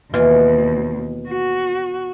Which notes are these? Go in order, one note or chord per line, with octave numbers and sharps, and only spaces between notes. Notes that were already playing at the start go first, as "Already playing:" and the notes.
D#2 B2 E3 F4
F#4